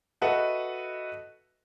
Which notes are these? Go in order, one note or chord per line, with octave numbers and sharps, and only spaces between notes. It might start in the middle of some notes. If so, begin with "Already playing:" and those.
F#4 A4 B4 D#5 E5 F#5